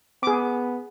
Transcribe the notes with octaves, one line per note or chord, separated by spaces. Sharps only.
B3 G#4 D6